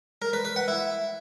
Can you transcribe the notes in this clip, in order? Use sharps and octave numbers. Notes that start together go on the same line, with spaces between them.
A#4
B4
B4
F#5
E4